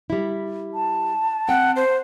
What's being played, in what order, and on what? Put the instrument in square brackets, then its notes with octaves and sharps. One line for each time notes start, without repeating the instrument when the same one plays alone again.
[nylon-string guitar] G3 E4
[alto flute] A5
[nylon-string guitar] C4 G5 [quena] F#5
[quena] C5